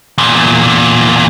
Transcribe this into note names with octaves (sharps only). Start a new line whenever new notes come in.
E2 A#2